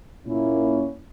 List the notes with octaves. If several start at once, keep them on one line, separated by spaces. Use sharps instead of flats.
A#2 A#3 C#4 E4